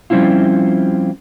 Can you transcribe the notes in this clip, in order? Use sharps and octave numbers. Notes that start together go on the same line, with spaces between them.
F3 G3 C4 C#4 E4 F4